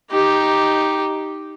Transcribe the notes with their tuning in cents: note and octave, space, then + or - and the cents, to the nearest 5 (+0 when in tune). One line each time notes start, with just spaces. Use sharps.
D#4 +0 G4 +0